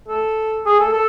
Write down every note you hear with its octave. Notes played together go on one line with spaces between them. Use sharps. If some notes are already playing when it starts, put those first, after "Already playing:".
A4
G#4
A4
A4